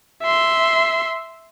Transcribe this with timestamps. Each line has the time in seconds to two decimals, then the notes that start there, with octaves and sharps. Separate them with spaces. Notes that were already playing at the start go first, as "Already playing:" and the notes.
0.23 E5 C6